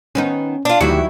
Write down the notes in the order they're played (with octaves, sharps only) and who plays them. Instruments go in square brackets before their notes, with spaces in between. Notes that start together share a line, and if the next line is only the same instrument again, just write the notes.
[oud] D#3 B3 D#4 [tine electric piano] C#4
[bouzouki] D4 F4
[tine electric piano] D2 G4 C#7 [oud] D#3 E3 F#3 [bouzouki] E4